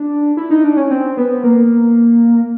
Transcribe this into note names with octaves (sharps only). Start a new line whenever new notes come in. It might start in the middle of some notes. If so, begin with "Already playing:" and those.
Already playing: D4
E4
D#4
D4
C#4
C4
B3
A#3